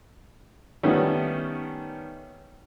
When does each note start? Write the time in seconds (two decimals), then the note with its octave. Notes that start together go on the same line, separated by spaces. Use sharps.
0.83 D#3 G3 A3 B3 C#4